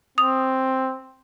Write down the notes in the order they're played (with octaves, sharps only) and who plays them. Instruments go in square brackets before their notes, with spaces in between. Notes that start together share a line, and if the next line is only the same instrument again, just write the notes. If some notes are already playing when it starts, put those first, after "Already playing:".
[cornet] C4 [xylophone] D#6 F7